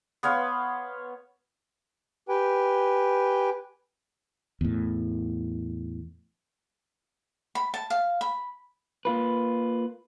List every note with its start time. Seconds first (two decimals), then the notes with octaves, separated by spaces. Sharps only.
0.23 B3 C#5 F5 C6
2.29 G4 B4 G5 G#5
4.61 E2 A2
7.55 B5
7.74 A5
7.90 F5
8.21 B5
9.05 A#3 F4 B4